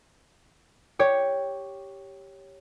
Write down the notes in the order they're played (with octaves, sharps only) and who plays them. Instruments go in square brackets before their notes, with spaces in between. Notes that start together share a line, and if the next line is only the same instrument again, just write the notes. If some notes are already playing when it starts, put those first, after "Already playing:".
[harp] G4 C#5